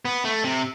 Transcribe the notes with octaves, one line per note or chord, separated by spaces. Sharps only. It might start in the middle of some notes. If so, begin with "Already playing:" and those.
B3
A3
C3